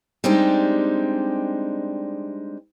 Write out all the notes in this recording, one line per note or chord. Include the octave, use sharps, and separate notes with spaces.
G3 G#3 C4 D4 D#4 G4